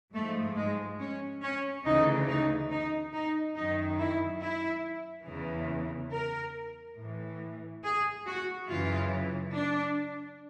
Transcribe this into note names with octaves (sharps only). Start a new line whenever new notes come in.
G#2 F3 A3
G#3
C#4
C#4
D2 C#3 E3 D#4
D#4
D#4
D#4
F#2 D#3 D#4
E4
E4
E2 C#3 E3
A#4
A2 E3
G#4
F#4
F#2 C#3 E3 F4
D4